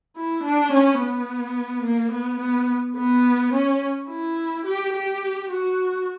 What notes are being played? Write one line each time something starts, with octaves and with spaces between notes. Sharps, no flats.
E4
D4
C#4
B3
A#3
B3
B3
B3
C#4
E4
G4
G4
F#4